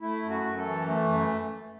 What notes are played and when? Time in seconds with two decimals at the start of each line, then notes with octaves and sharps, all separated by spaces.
0.01 A3 E4
0.22 F#2
0.30 F#4
0.44 F#2
0.58 A4
0.65 E3
0.87 A3
1.08 F#2